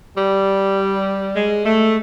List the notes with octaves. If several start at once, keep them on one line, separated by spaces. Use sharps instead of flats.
G3
G#3
A3